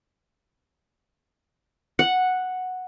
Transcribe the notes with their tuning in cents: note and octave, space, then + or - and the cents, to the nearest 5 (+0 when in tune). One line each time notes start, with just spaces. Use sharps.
F#5 -5